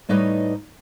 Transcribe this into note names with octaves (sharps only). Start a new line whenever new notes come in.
A2 G3 D#4 B4 C#5 D#5